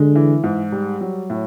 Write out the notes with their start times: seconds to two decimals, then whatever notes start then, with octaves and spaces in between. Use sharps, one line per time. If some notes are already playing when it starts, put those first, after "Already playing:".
Already playing: D3 G#3
0.15 E3
0.44 G#2
0.72 G3
1.01 F#3
1.30 A2